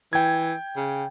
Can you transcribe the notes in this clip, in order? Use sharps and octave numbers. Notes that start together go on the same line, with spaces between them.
E3 G5 G#6
C#3